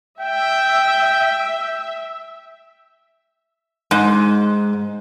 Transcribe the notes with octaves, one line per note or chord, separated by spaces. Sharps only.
E5 G5
G#2